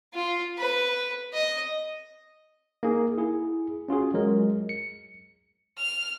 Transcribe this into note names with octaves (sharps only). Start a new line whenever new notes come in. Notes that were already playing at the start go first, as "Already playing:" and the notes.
F4
B4
D#5
A#3 D#4 G#4
E4 G#4
C#4 F4 F#4 G#4
F#3 G#3 A#4
C#7
F6